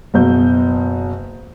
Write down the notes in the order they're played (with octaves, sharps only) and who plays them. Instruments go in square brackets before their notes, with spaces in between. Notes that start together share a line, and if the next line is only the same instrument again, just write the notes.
[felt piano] F#1 B2 G6